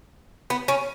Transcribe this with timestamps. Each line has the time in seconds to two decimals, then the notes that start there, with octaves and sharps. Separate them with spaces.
0.50 B3
0.68 C#4